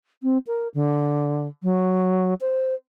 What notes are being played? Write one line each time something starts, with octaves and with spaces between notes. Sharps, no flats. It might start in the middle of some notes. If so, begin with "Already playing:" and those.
C4
A#4
D3
F#3
C5